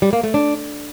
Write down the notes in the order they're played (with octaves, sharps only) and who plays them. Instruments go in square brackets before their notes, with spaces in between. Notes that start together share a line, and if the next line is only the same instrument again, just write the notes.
[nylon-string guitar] G3
A#3
A3
D4